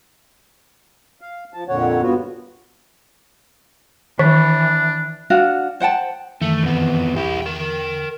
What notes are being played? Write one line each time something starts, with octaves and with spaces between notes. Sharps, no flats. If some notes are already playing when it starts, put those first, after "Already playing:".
F5
F3 A5
F2 A#2 D3 C#5 F#5
G2 B3 F4 F#4
D#3 E3 D4
D4 F#4 F5 F#5
C5 F#5 G5 A5
F#2 D#3 E3 A3
F2 B3
E2 E4 G4
A#4 G5